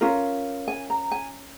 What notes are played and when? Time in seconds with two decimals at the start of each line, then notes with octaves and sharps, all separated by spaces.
0.01 C#4 F4 A#4
0.68 G#5
0.90 A#5
1.11 G#5